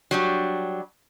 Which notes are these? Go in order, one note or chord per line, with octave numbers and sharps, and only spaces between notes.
F#3 G3 D4